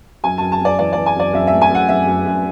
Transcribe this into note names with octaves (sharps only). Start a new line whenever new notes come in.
F#2 G#5
F#2 A5
A5
F#2 D5
E3 D5
E3 D5
G#5
F#2 D5
F#2 E5
E5
A3
G#5
F#2 F#5
F#2 E5
F#2
F#2